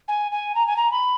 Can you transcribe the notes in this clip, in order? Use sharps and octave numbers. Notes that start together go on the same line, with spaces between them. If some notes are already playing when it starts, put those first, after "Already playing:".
G#5
G#5
A#5
G#5
A#5
B5